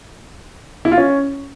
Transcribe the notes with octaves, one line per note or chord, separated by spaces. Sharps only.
E4
F4
C#4